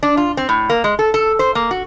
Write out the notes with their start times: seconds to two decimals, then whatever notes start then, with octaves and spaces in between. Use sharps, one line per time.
0.03 D4
0.17 F4
0.37 C4
0.49 A2
0.70 A#3
0.84 G#3
0.99 A4
1.14 A4
1.39 C5
1.55 A#3
1.71 F#4